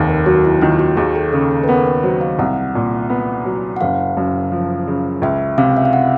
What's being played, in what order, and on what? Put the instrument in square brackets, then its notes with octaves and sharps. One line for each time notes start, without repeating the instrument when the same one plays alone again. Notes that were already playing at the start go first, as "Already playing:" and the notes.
Already playing: [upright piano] F1 D#2
[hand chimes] A#4
[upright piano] F#3 [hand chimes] F#4
[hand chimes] E4
[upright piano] D#3 [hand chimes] F4
[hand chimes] F#4
[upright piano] D#2 [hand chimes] G#4
[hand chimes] A4
[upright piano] C#3 [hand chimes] A4
[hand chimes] A4
B4
[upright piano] B3 [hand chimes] A#4
[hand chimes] B4
[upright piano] F#3 [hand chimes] C5
[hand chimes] F5
[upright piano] C2 [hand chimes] F#5
[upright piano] A#2
B3
F#3
[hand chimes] F#5
[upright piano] F#1 [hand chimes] F5
[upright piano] F#2
F3
C#3
[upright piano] C#2 [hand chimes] E5
[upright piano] C3 [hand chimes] F5
[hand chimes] E5
F5
F#5